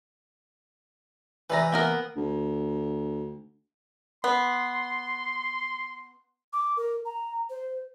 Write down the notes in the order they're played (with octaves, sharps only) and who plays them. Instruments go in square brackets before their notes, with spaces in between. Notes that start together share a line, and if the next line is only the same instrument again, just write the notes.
[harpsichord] C3 E3 [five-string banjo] B4 D5 A#5
[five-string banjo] A#3 B3 A#4
[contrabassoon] D2
[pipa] B3 [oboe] C6
[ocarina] D6
A#4
A#5
C5